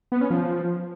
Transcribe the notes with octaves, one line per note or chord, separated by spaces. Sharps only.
B3
C#4
F3